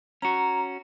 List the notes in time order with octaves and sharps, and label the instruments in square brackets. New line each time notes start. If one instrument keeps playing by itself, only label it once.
[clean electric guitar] C#4 F#4 [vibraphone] A#5